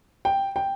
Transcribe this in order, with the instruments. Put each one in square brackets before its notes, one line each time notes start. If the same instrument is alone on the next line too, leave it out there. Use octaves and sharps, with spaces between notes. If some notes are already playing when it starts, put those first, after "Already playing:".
[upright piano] G5
G5